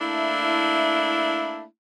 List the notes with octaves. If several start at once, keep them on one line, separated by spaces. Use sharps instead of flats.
A3 A#3 D4 E4